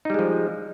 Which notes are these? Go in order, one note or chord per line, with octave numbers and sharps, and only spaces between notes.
F3 G3 G#3 D#4